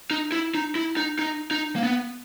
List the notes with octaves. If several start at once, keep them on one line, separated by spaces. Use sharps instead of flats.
D#4
E4
D#4
E4
D#4
D#4
D#4
A#3
B3